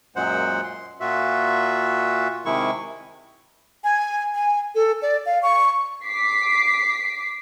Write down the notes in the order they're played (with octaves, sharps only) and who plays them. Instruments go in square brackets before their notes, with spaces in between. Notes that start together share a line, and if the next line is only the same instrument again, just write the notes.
[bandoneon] F#2 A#2 F#3 G#3 C5 F#5
C6
A#2 F4 F#4 E5
C3 D#3 G#3 E4 C#6
[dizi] G#5
G#5
A4
D5
F5
C#6
[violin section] D6 B6 C7